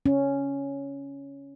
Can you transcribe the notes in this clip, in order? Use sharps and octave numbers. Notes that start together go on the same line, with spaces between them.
C#4